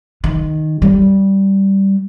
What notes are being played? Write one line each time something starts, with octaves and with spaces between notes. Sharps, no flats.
D#3
G3